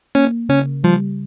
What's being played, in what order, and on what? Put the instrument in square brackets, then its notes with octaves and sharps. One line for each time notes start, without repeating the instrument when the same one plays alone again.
[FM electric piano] A#3 [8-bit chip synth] C#4
[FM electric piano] C#3 [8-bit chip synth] C#4
[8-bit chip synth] F3 [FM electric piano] G3